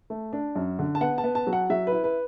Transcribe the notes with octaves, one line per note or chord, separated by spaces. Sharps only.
A3
D4
F#2
D3
A5
B3 F#5
A5
B3
A5
F#3
F#5
F#3 E5
B4
E4
B4